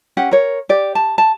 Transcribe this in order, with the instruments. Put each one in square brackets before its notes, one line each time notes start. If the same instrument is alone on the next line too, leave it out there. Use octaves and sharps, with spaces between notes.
[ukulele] C#4 G4 F#5
A#4 C#5
G4 D5
A5
A5